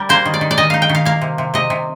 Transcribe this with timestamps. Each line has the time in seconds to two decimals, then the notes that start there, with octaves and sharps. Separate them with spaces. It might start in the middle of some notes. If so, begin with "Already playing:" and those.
Already playing: G3 A#4
0.09 A#3 C5
0.25 D#3
0.34 D5
0.41 D#3
0.51 D5
0.58 D#3 D#5
0.70 D#4 F5
0.82 G5
0.89 D#3
0.95 F5
1.05 A#3 F5
1.22 C3
1.38 C3
1.54 C3 D#5
1.70 C3